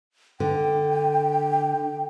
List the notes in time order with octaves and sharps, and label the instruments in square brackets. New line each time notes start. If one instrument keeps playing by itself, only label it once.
[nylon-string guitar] D3 [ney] G5